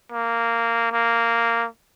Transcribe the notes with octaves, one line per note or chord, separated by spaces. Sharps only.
A#3
A#3